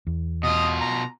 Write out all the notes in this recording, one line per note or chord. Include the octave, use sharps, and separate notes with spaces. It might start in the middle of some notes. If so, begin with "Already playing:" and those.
E2
B2 F4 D#5
A#5